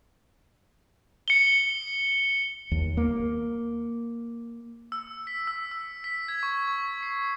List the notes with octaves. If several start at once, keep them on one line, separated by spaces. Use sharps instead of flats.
C#7 G7
D#2
A#3
E6
B6
E6
E6
B6
G#6
C#6
C#6
C7